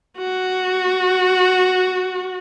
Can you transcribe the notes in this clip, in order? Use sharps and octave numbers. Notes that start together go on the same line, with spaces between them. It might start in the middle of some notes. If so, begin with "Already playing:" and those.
F#4